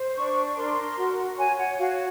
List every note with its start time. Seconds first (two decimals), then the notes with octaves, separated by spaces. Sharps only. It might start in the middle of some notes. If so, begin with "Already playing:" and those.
Already playing: C5
0.15 D4 C#6
0.56 A#4 C6
0.98 F#4
1.38 C#5 G#5
1.58 F#5
1.79 F#4 F5